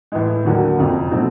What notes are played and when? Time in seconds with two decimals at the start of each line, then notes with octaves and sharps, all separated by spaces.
0.12 A2 E3 G#3
0.45 D#2 D3 F#3 A#3
0.78 F#1 F2 C3
1.11 B2 F#3 A3 C4